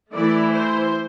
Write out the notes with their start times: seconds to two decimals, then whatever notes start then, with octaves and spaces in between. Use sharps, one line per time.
0.11 E3 A3 E4 D5
0.52 C5